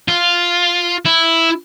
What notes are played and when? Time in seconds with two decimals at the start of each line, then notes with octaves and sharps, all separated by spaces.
0.08 F4
1.05 E4